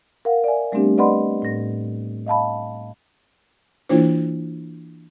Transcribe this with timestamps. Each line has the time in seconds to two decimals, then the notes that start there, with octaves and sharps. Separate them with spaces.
0.25 A#4 F5 F#5
0.44 D5 E5 G#5
0.72 G3 A3 B3 C4 D4 G4
0.98 B4 D5 D#5 F#5 B5 C6
1.42 A2 A#6
2.26 D#5 F5 A5 B5
3.89 E3 A#3 D4 E4 F4 C5